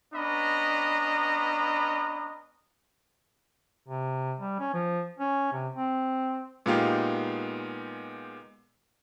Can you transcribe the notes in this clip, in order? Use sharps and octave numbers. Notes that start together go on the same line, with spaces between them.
B3 C#4 D4 D#5 A#5 B5
C3
G3
C#4
F3
C#4
C3
C4
A#2 G#3 B3 D#4 F4 G4